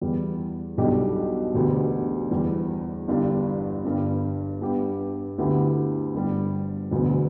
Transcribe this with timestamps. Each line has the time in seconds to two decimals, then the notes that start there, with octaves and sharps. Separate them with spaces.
0.01 E2 E3 G3
0.78 B1 B2 G3 D4 G4
1.54 E1 D2 D3 B3 G4
2.31 E2 E3 G3
3.08 G1 G2 G3 D4 G4
3.85 G1 G2 G3
4.61 G2 G3 B3 G4
5.38 D2 D3 B3 E4 G4
6.15 G1 G2 G3
6.91 E1 D2 D3 B3